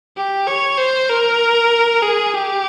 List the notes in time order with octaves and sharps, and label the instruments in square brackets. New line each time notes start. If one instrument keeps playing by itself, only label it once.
[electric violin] G4
C#5
C5
A#4
G#4
G4